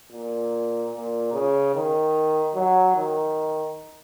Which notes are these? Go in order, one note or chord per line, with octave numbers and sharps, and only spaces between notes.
A#2
A#2
C#3
D#3
F#3
D#3